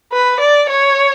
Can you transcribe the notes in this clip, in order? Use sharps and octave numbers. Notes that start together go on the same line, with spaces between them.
B4
D5
C#5